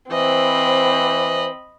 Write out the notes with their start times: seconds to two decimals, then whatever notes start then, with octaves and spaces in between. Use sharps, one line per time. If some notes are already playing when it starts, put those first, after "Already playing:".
0.11 E3 C4 C5 D#5 B5